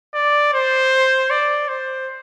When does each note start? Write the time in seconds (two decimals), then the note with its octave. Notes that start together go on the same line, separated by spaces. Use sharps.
0.14 D5
0.53 C5
1.30 D5
1.68 C5